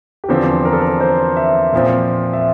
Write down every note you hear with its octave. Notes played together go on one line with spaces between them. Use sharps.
G4
E2 D3 F3 C4 A4
A#4
A4
A#4
C5
E5
A#2 F3 C4
E5